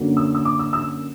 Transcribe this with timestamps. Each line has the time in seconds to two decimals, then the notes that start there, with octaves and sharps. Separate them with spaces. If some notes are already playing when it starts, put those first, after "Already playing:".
Already playing: F#2 D3 F#3 A#3
0.17 E6
0.35 E6
0.45 D6
0.59 E6
0.73 E6